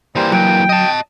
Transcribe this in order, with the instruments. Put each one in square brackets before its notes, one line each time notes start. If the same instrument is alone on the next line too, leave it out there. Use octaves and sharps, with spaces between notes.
[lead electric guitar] E3 A#3 [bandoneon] G3 C5
[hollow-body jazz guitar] F#3 [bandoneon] G5
[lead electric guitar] D#5 A5